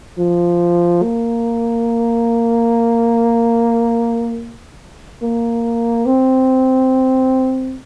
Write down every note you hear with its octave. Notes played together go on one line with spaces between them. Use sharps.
F3
A#3
A#3
C4